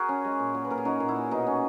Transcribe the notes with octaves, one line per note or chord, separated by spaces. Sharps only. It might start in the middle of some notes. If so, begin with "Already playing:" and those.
Already playing: F#4 G#4 A#4
C#4
G#3
A#2
A#2
B4
A#2 A#4
G#4
C#4 D#4 F#4
A#2
E4
A#2
B2 D#4
C#4